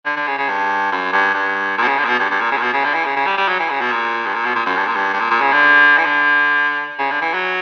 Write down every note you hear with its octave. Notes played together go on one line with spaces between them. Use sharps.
D3
D3
C#3
C#3
G2
F#2
G2
G2
A#2
B2
C#3
D3
A#2
B2
G2
G2
A#2
C#3
A#2
B2
C#3
D3
E3
C#3
C#3
G3
G3
F#3
E3
C#3
B2
A#2
G2
A#2
B2
A#2
F#2
G2
A#2
G2
G2
A#2
A#2
C#3
D3
E3
D3
C#3
D3
E3
F#3